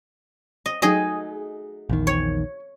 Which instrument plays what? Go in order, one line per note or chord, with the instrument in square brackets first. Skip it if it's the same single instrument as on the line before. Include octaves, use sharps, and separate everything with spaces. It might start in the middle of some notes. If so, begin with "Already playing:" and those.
[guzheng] D#5
[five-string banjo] F#3 A3 D#4 [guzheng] G#4 D#5
[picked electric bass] A#1 E2 D#3
[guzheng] C#5